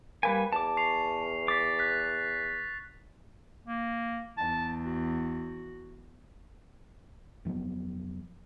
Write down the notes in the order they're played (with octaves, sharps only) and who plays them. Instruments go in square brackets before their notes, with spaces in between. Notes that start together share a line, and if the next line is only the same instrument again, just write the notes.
[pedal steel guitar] G3 B4 G#5 [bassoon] A#3
[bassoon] E2 [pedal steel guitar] A5 D6
[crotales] C#6 C7 F7
[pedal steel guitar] D6 [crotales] A6 B6
[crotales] F#6 B6
[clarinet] A#3
[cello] E2 [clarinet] A5
[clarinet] F#4
[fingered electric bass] F1 F3 F#3 B3